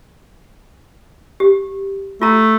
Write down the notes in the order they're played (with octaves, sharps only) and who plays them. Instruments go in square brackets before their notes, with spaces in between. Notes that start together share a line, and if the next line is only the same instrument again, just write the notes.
[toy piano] G4
[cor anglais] A3 [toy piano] F4 A#5